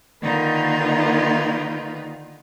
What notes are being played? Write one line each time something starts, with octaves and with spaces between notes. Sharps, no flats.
D3 D#3 A#3 D#4 F4 B4